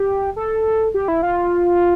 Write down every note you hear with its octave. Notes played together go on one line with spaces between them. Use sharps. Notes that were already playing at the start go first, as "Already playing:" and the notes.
Already playing: G4
A4
G4
E4
F4